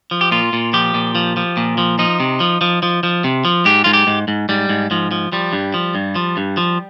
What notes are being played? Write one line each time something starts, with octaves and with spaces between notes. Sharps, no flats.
F3
G4
A#2 F4
A#2
F3 G4
A#2
F3
F3
A#2
F3
F3 D#4
C3
F3
F3
F3
F3
C3
F3
G#2 G4
G#2 F4
G4
G#2
G#2
G#2 G3
G#2
G#2 F3
F3
F3 G3
G2
F3
G2
F3
G2
F3